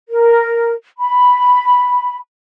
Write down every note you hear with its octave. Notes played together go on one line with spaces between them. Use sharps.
A#4
B5